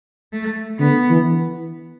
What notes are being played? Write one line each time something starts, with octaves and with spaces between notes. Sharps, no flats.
A3
D3 B3
E3